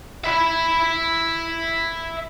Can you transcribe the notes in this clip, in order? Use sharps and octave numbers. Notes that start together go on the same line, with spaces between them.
E5 B5